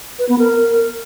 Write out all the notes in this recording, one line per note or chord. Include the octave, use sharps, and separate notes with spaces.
B4
B3
A#4